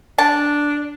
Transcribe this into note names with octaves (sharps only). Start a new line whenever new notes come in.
D4 A5